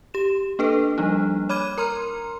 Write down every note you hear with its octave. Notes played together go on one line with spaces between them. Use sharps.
G4 E7
A#3 D4 A4 B4
F3 G3 A#3 D4 D#4
C#5 B5 D6 F6 G#6 D#7
A#4 A#5 C6 F6